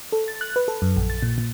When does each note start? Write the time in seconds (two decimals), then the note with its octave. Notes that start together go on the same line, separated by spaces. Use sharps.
0.12 A4
0.28 A6
0.41 F#6
0.56 B4
0.68 A4
0.82 F#2
0.97 A#1
1.10 A6
1.23 A#2
1.38 A#2